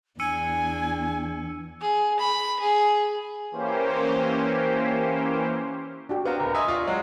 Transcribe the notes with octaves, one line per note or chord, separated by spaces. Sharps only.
E2 D4 G#5 E6 C#7 D#7
G#4
B5
G#4
E3 A#3 C#4 G4 C5
D4 F#4 G4
B3 C4 B4 F5 A#5
D1 A#4
D#5 E5 G#5 C6
F4 D5 C#6
F#3 G#3 C#5